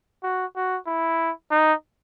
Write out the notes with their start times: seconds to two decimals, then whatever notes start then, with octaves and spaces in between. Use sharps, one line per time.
0.23 F#4
0.56 F#4
0.87 E4
1.51 D#4